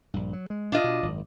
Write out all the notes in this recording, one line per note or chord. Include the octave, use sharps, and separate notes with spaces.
A#1 G2
F#3
G#3
A#2 D4 F4 D#5
B2
G#1 F#2